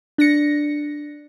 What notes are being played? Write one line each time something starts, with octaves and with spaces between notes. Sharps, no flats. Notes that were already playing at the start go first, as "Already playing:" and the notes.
D4 A#6 C#7